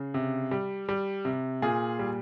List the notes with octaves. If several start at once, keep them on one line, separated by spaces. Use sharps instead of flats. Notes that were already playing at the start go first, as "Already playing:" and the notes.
Already playing: C#3
C3
G3
G3
C3
A#2 F4 G#4
G3